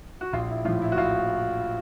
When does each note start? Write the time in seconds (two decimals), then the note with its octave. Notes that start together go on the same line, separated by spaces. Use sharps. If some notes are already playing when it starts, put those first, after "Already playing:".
0.21 F#4
0.33 A#1 F4
0.49 E4
0.65 A2 F4
0.68 F3
0.82 E4
0.92 F#4
0.97 A#1 F4